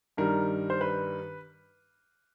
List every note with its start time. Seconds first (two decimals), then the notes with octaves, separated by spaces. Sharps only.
0.17 G2 D#3 G3 A#4
0.70 C5
0.81 B4